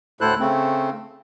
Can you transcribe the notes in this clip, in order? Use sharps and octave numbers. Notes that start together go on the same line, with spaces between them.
D2 A2 E4 A4 C5 F#6
C#3 A3 C4